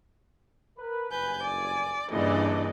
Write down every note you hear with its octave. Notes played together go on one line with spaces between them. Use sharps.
A#4 B4
F#1 G2 B4 G#5 G6
D5
G2 A#2 C#3 E3 D4 D5 D#5